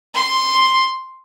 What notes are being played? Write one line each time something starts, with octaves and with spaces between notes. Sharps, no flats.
C6